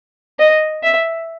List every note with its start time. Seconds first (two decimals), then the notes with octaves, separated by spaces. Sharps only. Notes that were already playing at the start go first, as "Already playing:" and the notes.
0.39 D#5
0.83 E5